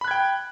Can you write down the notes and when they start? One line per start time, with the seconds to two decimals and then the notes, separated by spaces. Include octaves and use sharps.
0.01 B5
0.05 F#6
0.08 G#6
0.11 G5